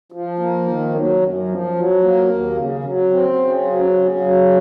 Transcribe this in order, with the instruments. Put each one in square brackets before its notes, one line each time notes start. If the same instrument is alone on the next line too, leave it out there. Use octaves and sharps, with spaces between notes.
[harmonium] F3
A#3
D#3
F#3
F#2
F3
F#3
A#3
D#2
C#3
F#3
C4
C#3
F#3
C#3
F#3